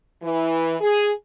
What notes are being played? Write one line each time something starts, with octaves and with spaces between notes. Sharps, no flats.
E3
G#4